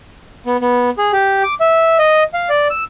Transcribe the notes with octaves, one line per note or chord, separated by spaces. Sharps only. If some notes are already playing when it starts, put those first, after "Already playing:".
B3
B3
G#4
G4
D6
E5
D#5
F5
D5
E6